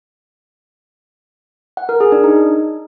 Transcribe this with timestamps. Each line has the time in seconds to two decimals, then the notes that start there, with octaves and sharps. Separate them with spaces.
1.77 F#5
1.89 A#4
2.00 G#4
2.12 D4
2.24 D#4